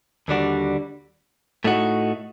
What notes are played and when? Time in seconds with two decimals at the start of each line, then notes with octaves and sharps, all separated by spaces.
0.28 D#2 D3 G3 D4 F#4
1.64 A2 A3 D#4 F#4